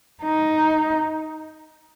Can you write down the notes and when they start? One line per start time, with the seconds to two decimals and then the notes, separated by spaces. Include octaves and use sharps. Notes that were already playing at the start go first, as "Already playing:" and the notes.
0.23 D#4